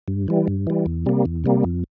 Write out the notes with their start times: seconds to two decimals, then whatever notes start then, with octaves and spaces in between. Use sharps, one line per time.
0.08 G2
0.28 E3 G3
0.48 G2
0.67 E3 G3
0.86 E2
1.06 C3 G3 A#3
1.26 E2
1.44 C3 G3 A#3
1.64 F2